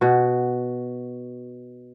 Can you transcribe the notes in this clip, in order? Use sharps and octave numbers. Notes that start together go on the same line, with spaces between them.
B2 F#4